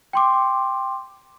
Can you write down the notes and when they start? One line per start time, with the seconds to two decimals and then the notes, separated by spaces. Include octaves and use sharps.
0.13 G5 C6 D6